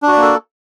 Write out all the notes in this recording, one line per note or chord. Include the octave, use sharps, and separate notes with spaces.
A#3 D4 F#4 A4 D5